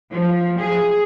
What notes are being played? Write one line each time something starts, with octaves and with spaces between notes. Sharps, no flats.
F3
G#4